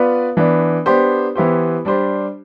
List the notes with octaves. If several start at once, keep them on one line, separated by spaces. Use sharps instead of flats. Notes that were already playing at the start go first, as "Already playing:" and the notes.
Already playing: B3 F4 B4 D5
E3 B3 D4
B3 D4 G4 C5
E3 B3 E4 G4 C5
G3 D4 G4 C5